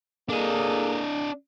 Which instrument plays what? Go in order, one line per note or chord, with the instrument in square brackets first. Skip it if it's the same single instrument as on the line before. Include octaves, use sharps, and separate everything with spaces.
[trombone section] A#3 G#4 A4 [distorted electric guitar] D4 D#5